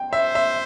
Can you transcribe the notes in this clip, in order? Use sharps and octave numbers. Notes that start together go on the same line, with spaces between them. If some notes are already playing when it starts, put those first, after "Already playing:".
Already playing: G5
C5 E5
E5